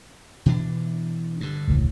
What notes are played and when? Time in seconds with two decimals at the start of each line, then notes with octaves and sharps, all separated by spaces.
0.46 B2 E3 D4
1.41 G2 D3
1.68 E1 C#2 A2